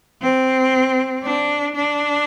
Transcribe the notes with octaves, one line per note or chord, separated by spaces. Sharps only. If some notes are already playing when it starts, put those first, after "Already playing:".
C4
D4
D4